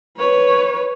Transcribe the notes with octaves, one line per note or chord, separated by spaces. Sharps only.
B4 C#5